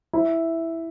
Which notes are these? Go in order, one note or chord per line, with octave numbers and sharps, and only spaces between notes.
E4